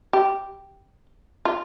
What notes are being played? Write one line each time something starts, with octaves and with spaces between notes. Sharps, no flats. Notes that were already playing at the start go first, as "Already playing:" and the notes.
G4
F4